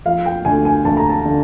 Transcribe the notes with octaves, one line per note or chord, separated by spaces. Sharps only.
F3 F5
G5
D2 G#5
G#5
D2 A5
A#5
A5
D3